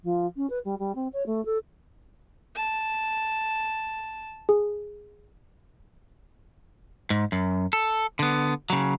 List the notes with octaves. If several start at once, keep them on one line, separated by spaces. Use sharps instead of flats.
F3
C#4
B4
G3
G3
C4
C#5
A3
A4
A5
G#4
G#2
F#2
A4
D3 B3
C#3 F#3